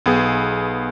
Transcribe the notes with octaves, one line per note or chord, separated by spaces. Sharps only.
B1 B3 G#4